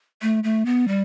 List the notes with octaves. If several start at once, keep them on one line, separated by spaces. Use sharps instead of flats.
A3
A3
B3
G3